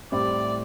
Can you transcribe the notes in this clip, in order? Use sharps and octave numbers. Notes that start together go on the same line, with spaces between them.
A2 G3 C4 E4 D5